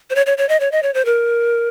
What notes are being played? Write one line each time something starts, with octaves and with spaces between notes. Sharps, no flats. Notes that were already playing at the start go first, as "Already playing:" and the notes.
C5
C#5
C#5
C#5
D#5
C#5
D#5
C#5
C5
A#4